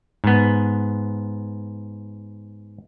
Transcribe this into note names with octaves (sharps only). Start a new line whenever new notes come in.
G#2 B3